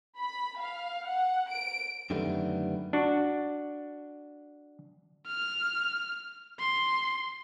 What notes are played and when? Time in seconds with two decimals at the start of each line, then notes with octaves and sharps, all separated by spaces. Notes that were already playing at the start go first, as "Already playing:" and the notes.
0.17 B5
0.61 F5
1.06 F#5
1.51 D7
2.10 F#2 D3 D#3 G3 A3 B3
2.93 D4 F#4
5.27 F6
6.59 C6